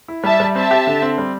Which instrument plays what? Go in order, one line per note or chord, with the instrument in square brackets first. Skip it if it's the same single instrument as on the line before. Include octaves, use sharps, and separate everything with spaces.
[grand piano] E4
[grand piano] G3 [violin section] E5 A5
[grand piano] G3
[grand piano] C4 [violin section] E5 A5
[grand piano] G4
D3
C4
G3